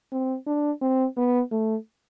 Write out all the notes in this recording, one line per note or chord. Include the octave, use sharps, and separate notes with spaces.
C4
D4
C4
B3
A3